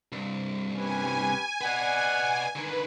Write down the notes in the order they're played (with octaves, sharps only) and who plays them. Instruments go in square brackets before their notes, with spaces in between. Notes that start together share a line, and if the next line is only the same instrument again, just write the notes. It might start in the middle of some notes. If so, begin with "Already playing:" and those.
[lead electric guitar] C2 G2
[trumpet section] C#4 G4 B4 [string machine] G#5
[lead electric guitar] B4 D#5 [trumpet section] D5 F#5
[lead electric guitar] D3 D#3 [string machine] B4